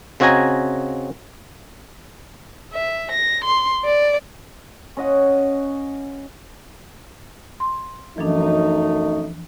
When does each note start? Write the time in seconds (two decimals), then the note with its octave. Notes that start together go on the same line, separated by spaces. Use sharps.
0.20 C#3 C4 F#4 D#5 G#5 A#5
2.73 E5
3.11 A#6
3.44 C6
3.85 D5
4.97 C#4 D#5 F#5
7.60 C6
8.18 F#2 E3 F3 A3 D4 D#4